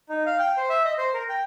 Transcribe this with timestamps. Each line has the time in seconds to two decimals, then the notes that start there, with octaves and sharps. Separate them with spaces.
0.09 D#4
0.26 F5
0.39 G5
0.57 C5
0.70 E5
0.85 D#5
0.98 C5
1.14 A#4
1.29 G5